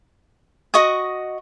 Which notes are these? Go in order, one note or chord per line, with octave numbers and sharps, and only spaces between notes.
F#4 D#5 C#6 D#6